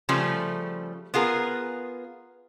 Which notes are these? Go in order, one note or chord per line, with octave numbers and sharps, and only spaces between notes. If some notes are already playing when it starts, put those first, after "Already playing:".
C#3 F3 G3 A3
B3 F4 G#4 A#4